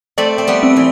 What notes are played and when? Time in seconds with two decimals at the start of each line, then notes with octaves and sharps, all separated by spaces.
0.18 A3 C4 D5
0.38 C4
0.47 G3 B3
0.63 C4
0.77 E3